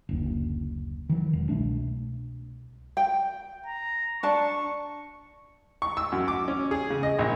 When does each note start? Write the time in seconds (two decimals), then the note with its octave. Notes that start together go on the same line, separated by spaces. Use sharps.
0.09 F#1 D2
1.10 D#3 E3 F#3
1.33 E1
1.49 C2 B2 A3 D4
2.97 G5
3.67 A#5
4.23 D4 A5 C#6
5.82 C#6
5.97 E6
6.12 F#2
6.28 D6
6.48 C#4
6.71 G#4
6.90 C#3
7.03 D#5
7.19 A#1